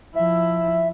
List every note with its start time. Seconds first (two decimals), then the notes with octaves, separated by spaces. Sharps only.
0.15 F3 E4 E5